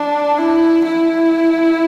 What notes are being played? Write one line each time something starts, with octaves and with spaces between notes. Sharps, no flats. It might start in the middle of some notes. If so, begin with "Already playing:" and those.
Already playing: D4
E4
E4